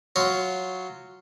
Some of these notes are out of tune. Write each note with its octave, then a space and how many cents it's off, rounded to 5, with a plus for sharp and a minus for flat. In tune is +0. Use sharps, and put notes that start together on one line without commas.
F#3 -5 F4 -10 C#5 +0